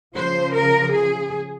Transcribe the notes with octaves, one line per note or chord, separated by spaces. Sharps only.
C#3 F3 C5
A#4
G#4